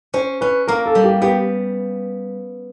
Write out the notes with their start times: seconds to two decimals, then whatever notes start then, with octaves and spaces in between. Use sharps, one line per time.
0.14 C#4 C5
0.41 C#4 B4
0.68 A#3 A#4
0.86 A4
0.95 G3
1.04 G4
1.22 B3 G4